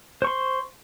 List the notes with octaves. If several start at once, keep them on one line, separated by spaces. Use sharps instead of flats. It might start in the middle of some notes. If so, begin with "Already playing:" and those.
C5 C6 C#6